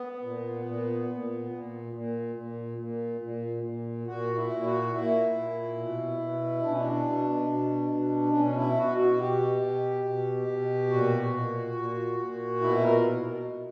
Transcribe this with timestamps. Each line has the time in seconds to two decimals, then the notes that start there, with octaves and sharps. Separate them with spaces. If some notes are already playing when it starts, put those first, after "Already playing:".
Already playing: B3
0.22 A#2
0.65 A#2
1.07 A#2
1.50 A#2
1.93 A#2
2.35 A#2
2.78 A#2
3.21 A#2
3.63 A#2
4.07 A#2 F#4
4.35 E4
4.50 A#2
4.64 F#4
4.93 A#2 E4
5.35 A#2
5.77 B2
6.20 B2
6.63 B2 D4
6.70 C#4
6.77 D4
7.05 B2
7.49 B2
7.91 B2
8.33 B2 C#4
8.56 E4
8.77 B2 F#4
8.98 F#4
9.20 B2 G4
9.62 B2
10.05 B2
10.48 B2
10.90 A#2 F#4
11.33 A#2
11.75 A#2
12.19 A#2
12.61 B2 E4
12.83 A#4
13.05 B2